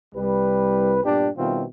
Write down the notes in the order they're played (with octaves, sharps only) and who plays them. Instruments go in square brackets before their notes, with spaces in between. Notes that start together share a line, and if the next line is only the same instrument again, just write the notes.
[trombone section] C2 G3 B4
G2 A#2 G3 B3 D4 G4
B2 D#3 G3 C4 E4 F4